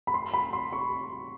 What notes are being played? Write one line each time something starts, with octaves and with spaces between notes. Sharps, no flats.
B5
C6
B5
C6
C#6